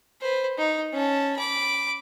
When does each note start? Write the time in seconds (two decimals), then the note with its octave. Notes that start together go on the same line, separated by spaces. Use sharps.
0.21 B4 C5
0.58 D#4
0.93 C#4 A5
1.37 B5 D6